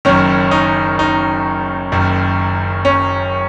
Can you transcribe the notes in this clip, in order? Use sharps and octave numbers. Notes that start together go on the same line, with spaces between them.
F#1 F#2 D#3 C#4
D#4
D#4
F#1 F#2 D#3
C#4